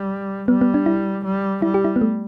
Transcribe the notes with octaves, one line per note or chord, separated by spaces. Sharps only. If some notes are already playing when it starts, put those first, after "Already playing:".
Already playing: G3
G3 B3
B3
D4
E4
G3
G3 E4
G4
E4
B3
A3